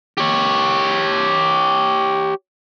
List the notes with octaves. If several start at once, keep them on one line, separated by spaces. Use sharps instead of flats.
G4 C#5